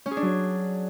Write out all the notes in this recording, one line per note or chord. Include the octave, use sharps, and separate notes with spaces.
C#4
G#4
D4
F#3